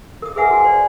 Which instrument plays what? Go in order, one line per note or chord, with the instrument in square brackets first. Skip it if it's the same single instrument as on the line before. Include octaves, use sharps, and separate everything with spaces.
[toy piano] A#4 D#6
G#4 A#4 B4 E5 F#5 G#5
F#4 G#5
C5 D5